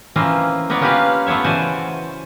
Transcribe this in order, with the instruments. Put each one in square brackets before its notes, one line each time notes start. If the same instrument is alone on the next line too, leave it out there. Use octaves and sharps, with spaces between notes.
[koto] E3 A#3 C4 C#4 F4
A#3 B3 B4 C#5 D5
A#3 C#4 F4 G4 B4 F5
A3 B3 F4 C#5 E5
C#3 E3 F#4 C5 D5 G#5